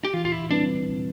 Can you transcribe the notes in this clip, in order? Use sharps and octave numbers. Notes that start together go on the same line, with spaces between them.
G4
E3 F4
F4
E4
G3 C4 D4 E4 B4